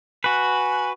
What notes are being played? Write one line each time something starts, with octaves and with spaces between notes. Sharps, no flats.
F#4 B4 G#5